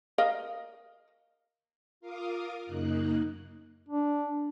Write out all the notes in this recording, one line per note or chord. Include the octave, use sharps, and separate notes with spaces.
A#4 D#5 F5
F4 A#4 F5 D6 D#6
F#2 C#3 A#3 D#4 F#6
D4